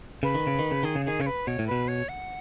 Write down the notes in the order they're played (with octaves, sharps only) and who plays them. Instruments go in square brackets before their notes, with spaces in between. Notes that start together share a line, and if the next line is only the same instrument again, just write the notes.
[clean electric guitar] C#3 [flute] B4
[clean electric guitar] D#3
C#3
D#3
C#3
[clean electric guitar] D#3 [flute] G#4
[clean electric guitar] C#3
[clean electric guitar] D#3 [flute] G#4
[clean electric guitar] C#3 [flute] C#5
[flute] B4
[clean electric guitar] B2 [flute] C#5
[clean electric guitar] A2
[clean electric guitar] B2 [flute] B4
[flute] C#5
F#5